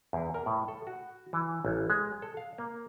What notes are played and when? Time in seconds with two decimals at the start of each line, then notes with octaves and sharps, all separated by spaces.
0.13 E2
0.34 A#4
0.46 A2
0.68 A4
0.87 F#4
1.33 E3
1.65 A1
1.90 G#3
2.22 A4
2.37 F5
2.58 A#3